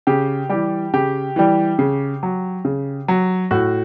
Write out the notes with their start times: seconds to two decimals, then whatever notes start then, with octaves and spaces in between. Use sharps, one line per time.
0.07 C#3 G4
0.49 E3 G3 G4
0.94 C#3 G4
1.36 E3 G3
1.79 C#3
2.23 F#3
2.65 C#3
3.08 F#3
3.51 A2 F#4